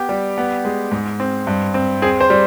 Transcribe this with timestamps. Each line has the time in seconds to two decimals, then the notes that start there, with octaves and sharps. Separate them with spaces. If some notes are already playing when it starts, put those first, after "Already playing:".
Already playing: B3 G4
0.09 G3
0.38 B3
0.65 G#3
0.92 G#2
1.20 C4
1.47 G2
1.74 C4
2.02 C4 G#4
2.21 C5
2.30 G3